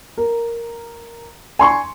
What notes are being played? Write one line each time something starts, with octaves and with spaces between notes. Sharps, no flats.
A#4
G#5 C6 C#6